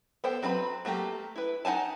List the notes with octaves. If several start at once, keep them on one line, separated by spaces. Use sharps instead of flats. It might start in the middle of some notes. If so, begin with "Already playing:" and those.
B3 A4 C5 G5
F#3 C4 B4 B5
F#3 A3 A#3 G4
E4 B4
D#4 F#5 G#5 A5